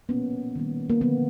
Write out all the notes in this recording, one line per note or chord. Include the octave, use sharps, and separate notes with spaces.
A#2 F3 A#3 B3 C#4
D#3 G3 A#3
A#3
D3 F3 A#3 B3